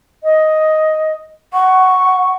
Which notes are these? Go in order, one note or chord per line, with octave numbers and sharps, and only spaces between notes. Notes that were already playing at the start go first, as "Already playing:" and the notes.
D#5
F#5 C#6